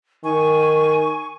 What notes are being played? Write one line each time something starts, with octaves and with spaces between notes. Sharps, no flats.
D#3 G#5 C#6